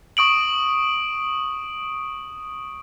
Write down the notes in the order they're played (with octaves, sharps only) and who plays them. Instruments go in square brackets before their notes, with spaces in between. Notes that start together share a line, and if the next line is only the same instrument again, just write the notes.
[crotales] C#6 D#6 D7 F#7